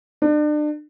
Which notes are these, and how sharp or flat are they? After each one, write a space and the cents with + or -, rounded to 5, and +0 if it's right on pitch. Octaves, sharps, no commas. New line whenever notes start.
D4 +35